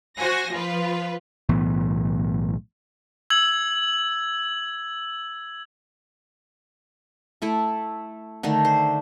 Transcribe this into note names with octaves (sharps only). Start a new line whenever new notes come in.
F#4 C5 G#5 A#6
F3 F4 B4
B1 A2 E3 B3
E6 G#6 F#7
A3 E4 A4
D3 D#3 A3 D4
C5